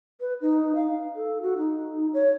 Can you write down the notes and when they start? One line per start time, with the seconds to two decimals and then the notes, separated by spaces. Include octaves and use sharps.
0.20 B4
0.41 D#4
0.75 F5
1.16 A4
1.42 F#4
1.58 D#4
2.14 C#5